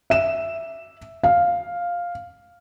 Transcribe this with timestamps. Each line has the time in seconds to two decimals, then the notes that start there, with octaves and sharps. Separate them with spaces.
0.10 E5 E7
1.23 F5